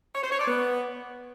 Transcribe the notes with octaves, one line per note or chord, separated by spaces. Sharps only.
C#5
C5
C#5
D5
B3